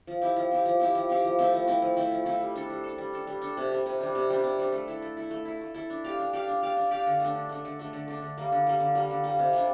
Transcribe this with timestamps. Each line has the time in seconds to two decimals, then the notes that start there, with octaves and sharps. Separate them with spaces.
0.07 F3
0.22 C4 E4 G4
0.36 F3
0.51 C4 E4 G4
0.65 F3
0.80 C4 E4 G4
0.95 F3
1.09 C4 E4 G4
1.24 F3
1.39 A3 C4 E4
1.53 F3
1.67 A3 C4 E4
1.82 F3
1.96 A3 C4 E4
2.12 F3
2.25 A3 C4 E4
2.40 G3
2.55 D4 A4
2.70 G3
2.84 D4 A4
2.98 G3
3.13 D4 A4
3.27 G3
3.41 D4 A4
3.57 C3
3.71 G3 D4
3.86 C3
4.01 G3 D4
4.15 C3
4.30 G3 D4
4.44 C3
4.59 G3 D4
4.72 A3
4.88 E4 A4
5.02 A3
5.17 E4 A4
5.31 A3
5.45 E4 A4
5.61 A3
5.74 E4 A4
5.90 D4
6.04 G4 D5 F5
6.19 D4
6.33 G4 D5 F5
6.48 D4
6.62 G4 D5 F5
6.77 D4
6.91 G4 D5 F5
7.07 D3
7.20 A3 D4
7.35 D3
7.49 A3 D4
7.65 D3
7.79 A3 D4
7.93 D3
8.08 A3 D4
8.22 D3
8.38 G3 A#3
8.52 D3
8.67 G3 A#3
8.80 D3
8.95 G3 A#3
9.10 D3
9.24 G3 A#3
9.39 C3
9.53 G3 D4